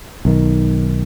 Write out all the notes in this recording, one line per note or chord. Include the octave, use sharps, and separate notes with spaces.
B1 D#3